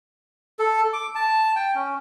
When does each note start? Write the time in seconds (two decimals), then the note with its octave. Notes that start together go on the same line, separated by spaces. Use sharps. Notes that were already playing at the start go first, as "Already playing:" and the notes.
0.59 A4
0.93 D6
1.15 A5
1.56 G5
1.75 C#4